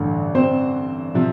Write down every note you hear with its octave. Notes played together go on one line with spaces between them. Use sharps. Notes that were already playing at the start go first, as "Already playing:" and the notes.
Already playing: A1 G2 D3
C4 C5
C3 F3